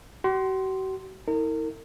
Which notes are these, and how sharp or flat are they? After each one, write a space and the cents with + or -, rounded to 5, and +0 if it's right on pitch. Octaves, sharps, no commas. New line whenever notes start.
F#4 +45 C6 +0
E4 -45 A#4 -35